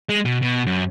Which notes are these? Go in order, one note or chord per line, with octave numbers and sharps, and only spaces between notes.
G#3
B2
B2
F#2